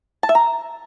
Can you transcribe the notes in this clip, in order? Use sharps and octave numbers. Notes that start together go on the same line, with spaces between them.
A5
E5
A#5